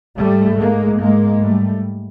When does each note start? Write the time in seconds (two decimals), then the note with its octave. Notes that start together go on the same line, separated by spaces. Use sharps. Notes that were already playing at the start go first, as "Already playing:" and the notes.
0.18 G#2 G3 A3
0.59 G#3 A#3
1.00 G#2 G#3 A#3
1.40 G3 A3